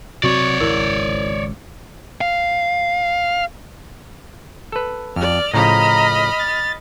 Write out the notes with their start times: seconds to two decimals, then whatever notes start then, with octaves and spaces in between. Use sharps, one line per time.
0.23 C3 F#3 C4 F#4 C#5 D5 C#6
0.60 G#1 C#2 E4 A#4 E6
2.21 F5
4.72 A4 B4
5.16 F2 D5 F6
5.54 A2 C#3 F3 D#5 A#5 B5 F6
6.39 A6